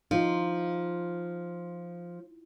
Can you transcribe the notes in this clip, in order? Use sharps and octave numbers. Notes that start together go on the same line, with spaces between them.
F3 D#4 F4